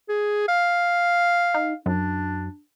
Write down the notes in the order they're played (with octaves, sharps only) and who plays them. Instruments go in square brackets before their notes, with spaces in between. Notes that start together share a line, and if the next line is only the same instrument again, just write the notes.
[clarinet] G#4
F5
[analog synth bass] D#4
[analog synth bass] F#2 [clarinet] D4